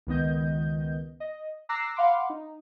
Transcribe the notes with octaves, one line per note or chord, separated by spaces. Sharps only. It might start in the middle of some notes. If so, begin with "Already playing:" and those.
C#2 D#3 B3 D#5 G6
D#5
A#5 D6 E6 F#6 A#6 C7
F5 F#5 B5 C6 D6
D#4